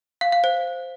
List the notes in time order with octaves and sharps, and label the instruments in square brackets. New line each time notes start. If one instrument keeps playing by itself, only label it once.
[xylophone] F5
F5
C5